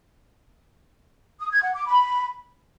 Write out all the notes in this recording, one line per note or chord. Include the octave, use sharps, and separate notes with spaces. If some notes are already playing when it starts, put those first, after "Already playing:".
D#6
G#6
F#5
D6
B5